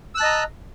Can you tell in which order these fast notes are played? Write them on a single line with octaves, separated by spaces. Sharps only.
E6 F#6 A5 D#5 A#5